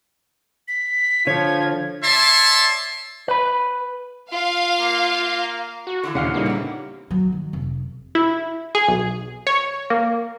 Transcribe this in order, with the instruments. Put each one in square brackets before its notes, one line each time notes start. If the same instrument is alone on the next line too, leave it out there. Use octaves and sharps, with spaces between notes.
[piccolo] B6
[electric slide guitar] D3 C#5 [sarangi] F3 [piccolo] G#6
[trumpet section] C#5 D5 E5 A5 C6
[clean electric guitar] B4 B5
[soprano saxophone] F4 [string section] F5
[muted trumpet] A#3
[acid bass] F#4
[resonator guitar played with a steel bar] D3 E3 E4
[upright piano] A#1 F5 C7 [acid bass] D#2 [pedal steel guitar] C#3 F#5 F6
[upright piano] A#2 G3 D#4 [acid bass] A#3
[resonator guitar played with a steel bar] C4 E4
[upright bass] F#3
D#3
F1
[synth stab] E4
G#4
B1
C#5
A#3